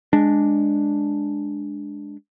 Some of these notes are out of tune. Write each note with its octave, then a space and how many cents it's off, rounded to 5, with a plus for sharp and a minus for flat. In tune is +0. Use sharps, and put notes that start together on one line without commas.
G#3 +0 D4 +0